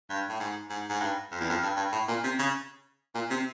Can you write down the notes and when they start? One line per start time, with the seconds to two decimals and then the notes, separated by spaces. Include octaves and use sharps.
0.09 G2
0.29 A2
0.40 G#2
0.70 G#2
0.89 G#2
1.00 G2
1.32 F2
1.40 E2
1.50 F2
1.62 G2
1.77 G2
1.92 A2
2.08 A#2
2.24 C3
2.39 C#3
3.14 A#2
3.30 C3